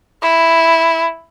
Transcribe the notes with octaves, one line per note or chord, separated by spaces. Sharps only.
E4